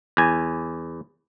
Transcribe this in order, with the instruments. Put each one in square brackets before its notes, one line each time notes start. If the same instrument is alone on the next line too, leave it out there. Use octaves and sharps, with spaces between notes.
[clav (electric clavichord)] E2 G#5